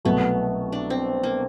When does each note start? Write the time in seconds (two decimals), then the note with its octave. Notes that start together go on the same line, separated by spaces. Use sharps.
0.05 C2 B2 F#3 A3 B3
0.72 D4
0.90 C4
1.23 A#3